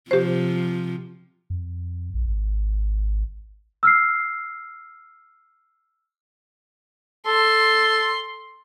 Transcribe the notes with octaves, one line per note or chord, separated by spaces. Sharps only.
C3 F3 G4 C5
F2
A#1
G#1
E6 F6 C7
A4 C6